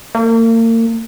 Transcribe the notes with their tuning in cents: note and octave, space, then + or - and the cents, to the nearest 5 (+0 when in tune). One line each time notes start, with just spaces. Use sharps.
A#3 -40